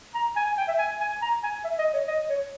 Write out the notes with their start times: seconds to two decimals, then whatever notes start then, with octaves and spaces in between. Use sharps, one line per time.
0.14 A#5
0.36 G#5
0.46 G#5
0.58 G5
0.68 E5
0.79 G#5
1.01 G#5
1.22 A#5
1.43 G#5
1.64 E5
1.79 D#5
1.94 C#5
2.08 D#5
2.29 C#5